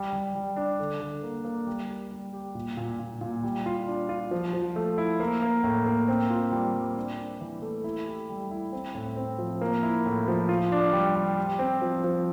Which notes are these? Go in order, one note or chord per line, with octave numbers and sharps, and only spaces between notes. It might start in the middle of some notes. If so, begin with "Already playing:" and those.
Already playing: G3
G3
G3
D4
D3
D3
A#3
A#3
G3
G4
G3
G4
A#2
A#2
A#2
A#2
G3
F4
D4
F4
F3
F3
A3
E4
A#3
A#3
A2
A#3
C4
F4
G3
G3
D4
D4
E3
A3
E4
G4
G3
E4
C4
A2
C4
F3
A#3
E4
A2
F3
F4
D4
G3
G3
G4
C4
F3
F3